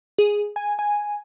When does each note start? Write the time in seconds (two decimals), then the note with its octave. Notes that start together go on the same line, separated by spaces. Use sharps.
0.18 G#4
0.56 G#5
0.79 G#5